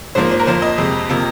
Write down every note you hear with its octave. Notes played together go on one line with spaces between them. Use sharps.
G#2 F3 A#3 C5
C5
A#4
F2 F3 A#3 C5
D#5
F2 C3 G#3
C3 F3 A#3